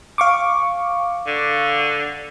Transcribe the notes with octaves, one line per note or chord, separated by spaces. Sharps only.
F5 C#6 D6
D3